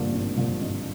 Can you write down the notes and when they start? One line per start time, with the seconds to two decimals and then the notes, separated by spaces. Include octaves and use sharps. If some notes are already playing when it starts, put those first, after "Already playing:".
Already playing: G#1 G2 D3 F3 A#3
0.12 G#1
0.36 G2 D3 F3 A#3
0.61 G#1 D#5